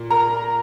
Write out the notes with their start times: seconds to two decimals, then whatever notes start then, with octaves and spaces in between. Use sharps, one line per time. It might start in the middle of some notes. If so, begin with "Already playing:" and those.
Already playing: A#2
0.10 A#4 A#5